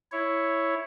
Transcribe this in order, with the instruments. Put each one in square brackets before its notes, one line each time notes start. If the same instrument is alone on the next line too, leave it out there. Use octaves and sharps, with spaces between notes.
[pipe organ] E4 C#5